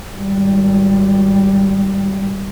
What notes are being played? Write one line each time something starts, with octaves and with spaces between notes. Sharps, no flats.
G#1 G3